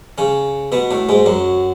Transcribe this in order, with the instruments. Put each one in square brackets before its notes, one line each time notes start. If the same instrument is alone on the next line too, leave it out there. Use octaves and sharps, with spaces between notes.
[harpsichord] C#3 C#4
[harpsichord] B2 B3 [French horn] F#4
[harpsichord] A2 A3
G#2 G#3
[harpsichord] F#2 F#3 [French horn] F#4